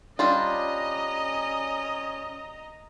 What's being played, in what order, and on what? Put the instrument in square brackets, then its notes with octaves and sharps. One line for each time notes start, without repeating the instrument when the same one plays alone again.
[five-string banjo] G3 D4 F4 [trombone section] C#4 [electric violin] D#5 A#5